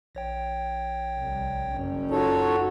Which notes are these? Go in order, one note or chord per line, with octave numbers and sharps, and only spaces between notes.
A#1 C#5 G5
C2
F#1 C#4
D#4 F4 F#4 A4 C#5